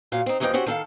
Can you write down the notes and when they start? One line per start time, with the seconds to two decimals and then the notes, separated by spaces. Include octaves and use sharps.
0.12 A#2 F#3 F5
0.26 C4 D#4
0.40 D#2 E3 F3 G#3 D#4 G5
0.53 C4 C#4 F#4 G4
0.66 D#3 A4 F5